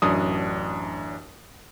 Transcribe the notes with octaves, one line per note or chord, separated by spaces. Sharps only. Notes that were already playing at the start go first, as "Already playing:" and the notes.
A1 F#2 D4 D#6